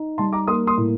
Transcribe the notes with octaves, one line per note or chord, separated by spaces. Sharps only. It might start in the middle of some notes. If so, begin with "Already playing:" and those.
Already playing: D#4
G3 A5 C6
A#5 D6
A#3 C6 D#6
C6 D#6
A2